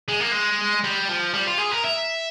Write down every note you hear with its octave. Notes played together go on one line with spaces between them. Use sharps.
G#3
A#3
G#3
G3
F3
G3
F4
G#4
A#4
E5